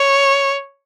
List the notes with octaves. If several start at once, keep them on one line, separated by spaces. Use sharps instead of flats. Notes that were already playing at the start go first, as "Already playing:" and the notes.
Already playing: C#5